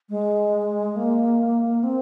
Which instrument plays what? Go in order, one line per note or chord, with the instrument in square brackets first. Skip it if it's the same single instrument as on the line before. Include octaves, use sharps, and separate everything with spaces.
[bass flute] G#3
A#3
C4